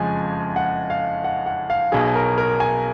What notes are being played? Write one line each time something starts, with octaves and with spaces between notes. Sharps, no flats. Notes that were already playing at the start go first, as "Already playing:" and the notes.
Already playing: F#1 F2 F3 G#3 G#5
F#5
F5
F#5
F#5
F5
B1 B2 F#3 G#4
A#4
A#4
G#5